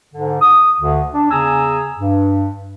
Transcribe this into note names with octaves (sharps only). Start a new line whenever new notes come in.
G#2 D3
D#6
D2 D3
D4
E2 C#3 G#4 G#5 A#5 E6
G2